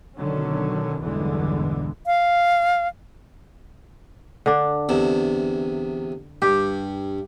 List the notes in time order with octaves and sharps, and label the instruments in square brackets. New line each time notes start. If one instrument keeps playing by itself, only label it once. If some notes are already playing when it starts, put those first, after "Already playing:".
[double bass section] B2 D3 D#3 F#3 C#4
B1 E2 G2 D3 E3 G#3
[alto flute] F5
[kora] D3 D4
[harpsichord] E2 C3
[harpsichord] G2 [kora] G4